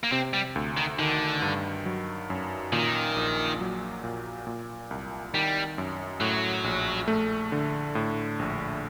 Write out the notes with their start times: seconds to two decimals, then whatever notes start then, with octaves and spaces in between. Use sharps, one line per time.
0.04 A#3
0.12 C3 C4
0.33 G3
0.56 D2
0.77 D#3
0.99 D3 D#3
1.42 G2
1.86 F#3
2.30 F#2
2.72 A#2 D#3
3.16 A#1
3.60 F#3
4.04 A#2
4.47 A#2
4.91 C2
5.33 D#3 G3
5.78 F#2
6.21 A2 F#3
6.64 A#1
7.08 A3
7.52 D3
7.95 A2
8.39 A#1